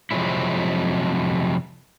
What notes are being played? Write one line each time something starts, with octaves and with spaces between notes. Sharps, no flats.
F2 C3 F3 F#3 G#3 E4